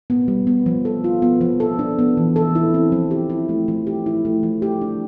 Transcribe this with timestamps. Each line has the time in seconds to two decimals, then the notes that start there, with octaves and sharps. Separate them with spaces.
0.10 B3
0.28 G3
0.47 B3
0.66 F3
0.85 A4
1.04 F4
1.22 B3
1.41 F3
1.60 A4
1.79 D4
1.99 B3
2.17 E3
2.36 A4
2.55 E4
2.74 C4
2.92 F3
3.11 G4
3.30 E4
3.49 A3
3.68 F3
3.87 G4
4.06 E4
4.25 A3
4.43 F3
4.62 G4
4.82 D4